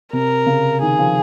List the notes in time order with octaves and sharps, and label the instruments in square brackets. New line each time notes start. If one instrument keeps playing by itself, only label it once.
[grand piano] C3 [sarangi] A#4
[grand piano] C#3
[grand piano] D#3 [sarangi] G#4
[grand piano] F3